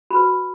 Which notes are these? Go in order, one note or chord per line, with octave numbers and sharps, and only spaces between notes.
F#4 B4 B5